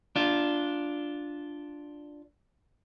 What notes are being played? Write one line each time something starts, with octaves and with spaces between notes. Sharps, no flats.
D4 F4